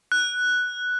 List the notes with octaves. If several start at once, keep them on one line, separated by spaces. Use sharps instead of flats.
F#6